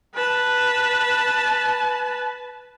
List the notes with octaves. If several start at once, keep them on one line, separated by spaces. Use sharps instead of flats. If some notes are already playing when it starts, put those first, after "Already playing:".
B4 A5